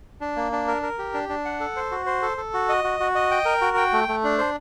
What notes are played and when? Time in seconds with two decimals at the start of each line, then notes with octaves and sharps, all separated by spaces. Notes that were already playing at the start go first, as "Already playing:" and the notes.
0.21 D4
0.36 A#3
0.52 D4
0.68 A#4
0.83 A#4
0.99 G4
1.14 D4
1.29 D4
1.45 F#5
1.60 A4
1.76 C5
1.91 F#4
2.06 C5
2.22 A4
2.37 A4
2.54 F#4
2.69 D#5
2.84 F#4
3.00 F#4
3.15 D#5
3.31 G5
3.45 A#4
3.61 F#4
3.77 G5
3.93 A3
4.08 A3
4.24 D4
4.38 C5